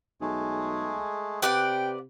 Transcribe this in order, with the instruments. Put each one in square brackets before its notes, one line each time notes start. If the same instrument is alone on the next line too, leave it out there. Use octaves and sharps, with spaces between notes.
[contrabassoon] B1 [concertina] G#3 A3 G#4
[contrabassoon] C3 [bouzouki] B4 D5 F#5 [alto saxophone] G5